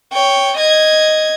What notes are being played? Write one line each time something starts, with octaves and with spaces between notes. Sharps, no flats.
C#5 G5
D#5 G#6